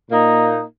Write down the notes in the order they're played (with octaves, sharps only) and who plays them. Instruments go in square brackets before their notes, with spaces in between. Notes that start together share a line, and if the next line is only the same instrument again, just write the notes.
[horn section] A#2 A#3 D#4